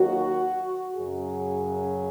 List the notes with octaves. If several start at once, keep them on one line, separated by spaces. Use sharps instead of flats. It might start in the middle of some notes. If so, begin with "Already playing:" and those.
Already playing: D#2 D#3 F#3 F#4
F#2 C#3 F#3 G#4